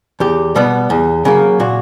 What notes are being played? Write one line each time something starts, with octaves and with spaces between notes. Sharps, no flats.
E2 G4
B2 G3 B3
E2
C#3 F#3 A#3
A#2 F#4